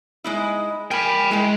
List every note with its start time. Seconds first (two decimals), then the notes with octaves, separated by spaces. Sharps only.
0.24 G#3 D#4 E4
0.91 A#4 G5 G#5 B5
1.31 G#3 E4 G5